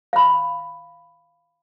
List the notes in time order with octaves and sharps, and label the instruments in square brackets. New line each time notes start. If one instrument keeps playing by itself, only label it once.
[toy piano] F5 B5